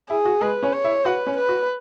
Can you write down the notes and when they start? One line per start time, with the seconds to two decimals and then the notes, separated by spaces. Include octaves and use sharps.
0.10 E4 G#4
0.25 F#4
0.41 G#3 G#4 B4
0.63 C#4 C#5
0.73 C#5
0.84 E4 E5
1.05 F#4 B4 F#5
1.27 C#4 C#5
1.37 B4
1.49 F#4